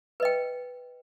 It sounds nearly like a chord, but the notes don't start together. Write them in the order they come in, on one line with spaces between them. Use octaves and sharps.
B4 D#5 G5